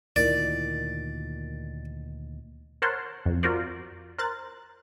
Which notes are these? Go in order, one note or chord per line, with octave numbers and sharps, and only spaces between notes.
D2 A#2 D3 D#3 E4 A#4 D5
A#4 C5 C#5 F#5 A5 C6
F2
F4 F#4 A#4 C5 D5
A#4 C5 F#6 A6